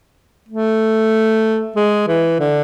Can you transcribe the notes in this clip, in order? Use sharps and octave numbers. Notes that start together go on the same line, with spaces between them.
A3
G#3
E3
D3